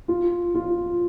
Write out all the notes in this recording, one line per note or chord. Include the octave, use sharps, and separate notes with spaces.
F4
F4